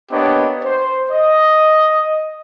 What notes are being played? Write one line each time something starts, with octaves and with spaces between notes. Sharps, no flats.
A#3 B3 D4 G4 C#5 D#5
C5
D#5